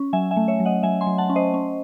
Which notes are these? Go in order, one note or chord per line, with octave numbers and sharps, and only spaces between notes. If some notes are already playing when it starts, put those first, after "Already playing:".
Already playing: C#4
F#3 E5 G#5
E5 G#5
A3
C#5 E5
F#3
D#5 F#5
F#3 E5 G#5
G#5 C6
F#3
F#5 A5
C#4
C5 D#5
C#4